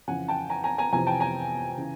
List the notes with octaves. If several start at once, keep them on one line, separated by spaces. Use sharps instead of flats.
F2 C#3 E3 F#5 G#5
G5 A5
G#5 A#5
G#5 A#5
G#5 A#5
F2 C3 E3 G#5 A#5
G5 A5
G#5 A#5
C#3 E3